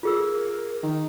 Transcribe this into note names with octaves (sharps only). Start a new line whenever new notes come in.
F4 G#4 A#4 E6
D#3